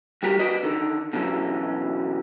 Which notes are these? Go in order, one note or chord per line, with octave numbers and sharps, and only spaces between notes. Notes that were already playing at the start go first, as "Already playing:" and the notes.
G3 F#4 G4 A#4
F#4 B4 D5 D#5
D3 D#3
B2 D3 E3 F#3 C#4